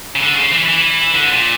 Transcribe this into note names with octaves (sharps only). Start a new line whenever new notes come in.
C#3
D3
C#3
E3
E3
D3
A#2